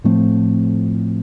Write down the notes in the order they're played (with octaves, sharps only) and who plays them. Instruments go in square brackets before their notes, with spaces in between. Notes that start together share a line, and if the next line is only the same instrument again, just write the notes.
[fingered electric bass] A2 F3 A3 C4